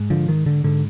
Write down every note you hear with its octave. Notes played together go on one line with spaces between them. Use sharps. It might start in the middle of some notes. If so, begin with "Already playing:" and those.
Already playing: G#2
D3 F3
D#3
D3
G#2 D3